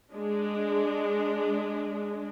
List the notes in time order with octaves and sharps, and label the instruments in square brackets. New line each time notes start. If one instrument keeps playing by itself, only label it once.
[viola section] G#3 D4